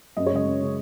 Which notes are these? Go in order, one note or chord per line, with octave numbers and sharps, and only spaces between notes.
F#2 D#5
C#5
C#3 G#3 D#5
F#2
C#3 G#3